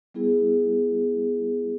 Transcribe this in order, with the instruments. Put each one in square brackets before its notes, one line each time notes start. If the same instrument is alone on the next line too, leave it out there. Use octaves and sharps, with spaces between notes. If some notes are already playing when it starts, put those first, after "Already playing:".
[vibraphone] G3 B3 E4 G#4